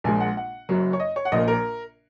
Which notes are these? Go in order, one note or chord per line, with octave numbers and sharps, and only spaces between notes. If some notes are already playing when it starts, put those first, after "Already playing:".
A#1 A#2 G#3 G#5
F#5
F#5
F#1 F#2 F#3
C#5
D#5
C#5
F#5
A#1 A#2 A#3 D#5
A#4